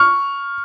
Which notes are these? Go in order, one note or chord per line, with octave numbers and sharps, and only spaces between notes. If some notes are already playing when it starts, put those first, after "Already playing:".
Already playing: C#6 F6